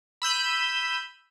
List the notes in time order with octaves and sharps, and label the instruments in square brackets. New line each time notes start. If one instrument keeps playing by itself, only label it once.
[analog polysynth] B5 E6 G6 D#7